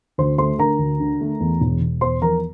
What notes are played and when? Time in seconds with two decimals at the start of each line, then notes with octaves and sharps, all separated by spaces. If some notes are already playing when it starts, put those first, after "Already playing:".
0.18 D2 C5 C6
0.38 A3 C5 C6
0.58 D3 A#4 A#5
0.79 D2
1.00 D3
1.21 A3
1.40 E2
1.61 E1
1.81 E1
2.01 E2 C5 C6
2.22 F3 A#4 A#5